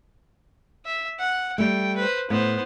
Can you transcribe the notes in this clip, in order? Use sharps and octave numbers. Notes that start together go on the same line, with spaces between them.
E5
F#5
G3 A3 G5
B4 C5
A2 B3 C5